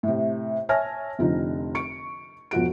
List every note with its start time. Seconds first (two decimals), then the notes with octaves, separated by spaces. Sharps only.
0.03 A2 C3
0.69 C#5 E5 G#5 A5 F6 A#6
1.19 F1 D3 F3 D#4
1.75 C#6 C#7 D7
2.51 E1 F3 F#4 D7